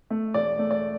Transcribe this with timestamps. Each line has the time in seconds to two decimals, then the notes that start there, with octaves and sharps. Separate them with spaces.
0.10 A3
0.34 E1 D5
0.59 A3
0.71 D5